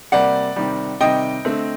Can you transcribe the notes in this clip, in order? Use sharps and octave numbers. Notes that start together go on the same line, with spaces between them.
C3 G3 A#3 D5 F#5
C3 D#3 G3
C3 D#3 G3 D#5 G5
D3 A3 C4